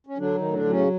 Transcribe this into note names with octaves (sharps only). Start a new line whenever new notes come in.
C#4
D3 F#3 D4
A2 D#3 D#4
D3 D4
F#3
C#3 C#4